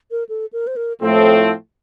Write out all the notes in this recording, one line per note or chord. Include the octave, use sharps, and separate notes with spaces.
A#4
A4
A#4
C5
A#4
A2 F3 A3 C4 A4